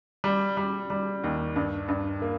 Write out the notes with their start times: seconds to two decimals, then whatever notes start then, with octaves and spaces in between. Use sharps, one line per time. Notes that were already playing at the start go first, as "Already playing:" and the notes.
0.24 G3
0.57 G3
0.90 G3
1.24 D#2
1.56 G2
1.88 G2
2.22 A#3